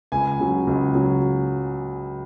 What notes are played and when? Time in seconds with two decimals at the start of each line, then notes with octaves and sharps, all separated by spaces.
0.12 C#2 G#5
0.40 C#3 F#3
0.67 C#2
0.95 C#3 F#3